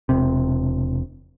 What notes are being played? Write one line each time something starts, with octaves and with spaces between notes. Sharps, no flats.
E1 C3